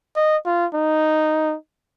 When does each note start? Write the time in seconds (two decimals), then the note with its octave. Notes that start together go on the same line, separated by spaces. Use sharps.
0.16 D#5
0.45 F4
0.74 D#4